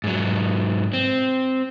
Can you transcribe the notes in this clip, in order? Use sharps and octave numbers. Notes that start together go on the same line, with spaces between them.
G#2 F#3
C4